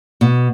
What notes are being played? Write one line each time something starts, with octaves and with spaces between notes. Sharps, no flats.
B2